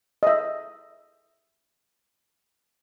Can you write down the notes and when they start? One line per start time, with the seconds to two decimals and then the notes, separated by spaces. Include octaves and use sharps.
0.23 D#5 E5